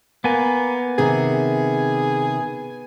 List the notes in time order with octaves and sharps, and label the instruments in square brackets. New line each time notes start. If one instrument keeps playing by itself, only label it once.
[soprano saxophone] A#3 [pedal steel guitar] B3 G#5
[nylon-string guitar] C3 D#3 [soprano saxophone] G#4